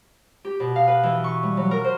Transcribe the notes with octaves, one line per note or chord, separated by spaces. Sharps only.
G4
B2
F5
B4
E3
C#6
G3
F#3
A#4
C5